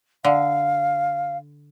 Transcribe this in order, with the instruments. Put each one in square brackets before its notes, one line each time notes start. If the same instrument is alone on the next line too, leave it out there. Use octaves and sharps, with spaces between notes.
[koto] D3 [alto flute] F5